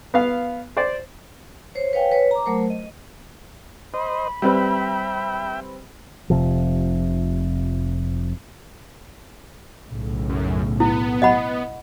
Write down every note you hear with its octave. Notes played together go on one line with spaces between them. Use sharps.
B3 F5
C5 D5
C5 C#5
B4 C#5 F5 G5 G#5
B4 C#5
A#5 D6
F#3 A3 A#4 C5
D#5
C5 D#5 B5
G3 C4 B4 E5 G5
F1 C3 F3
B1 A2 C#3
F#2
B3 E4
D#5 F#5 B5